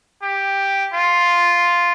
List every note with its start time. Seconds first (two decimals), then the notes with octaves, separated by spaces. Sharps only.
0.22 G4
0.94 F4